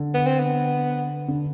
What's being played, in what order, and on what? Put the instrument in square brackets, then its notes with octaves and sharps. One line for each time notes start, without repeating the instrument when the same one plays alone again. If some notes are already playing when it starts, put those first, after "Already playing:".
Already playing: [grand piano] D3
[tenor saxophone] B3
C4
B3
[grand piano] D3